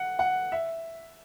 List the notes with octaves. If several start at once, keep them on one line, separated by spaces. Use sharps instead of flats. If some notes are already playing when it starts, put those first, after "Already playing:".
Already playing: F#5
F#5
E5